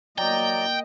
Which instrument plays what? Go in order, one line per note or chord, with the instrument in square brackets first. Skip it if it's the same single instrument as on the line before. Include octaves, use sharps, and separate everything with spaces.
[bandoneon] F#3 D5 A#5 [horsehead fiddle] A#3 D#5 [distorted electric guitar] G5